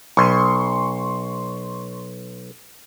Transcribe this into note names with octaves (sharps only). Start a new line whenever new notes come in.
B1 C6 C#6